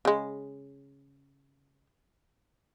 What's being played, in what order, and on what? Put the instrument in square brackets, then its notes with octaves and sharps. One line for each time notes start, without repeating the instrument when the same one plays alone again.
[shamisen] C#3 G#3